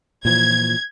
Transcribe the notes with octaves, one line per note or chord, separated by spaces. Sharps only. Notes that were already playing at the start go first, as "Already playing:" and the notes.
A#2 E3 F3 G#6